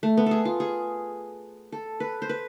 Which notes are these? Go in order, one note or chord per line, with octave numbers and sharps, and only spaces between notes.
A3
B3
G#4 A4
F4
G#4
A4
B4
C5
B4